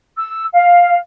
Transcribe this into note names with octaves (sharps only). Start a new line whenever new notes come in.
E6
F5